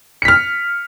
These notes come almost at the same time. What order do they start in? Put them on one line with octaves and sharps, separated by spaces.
C#7 B6 F6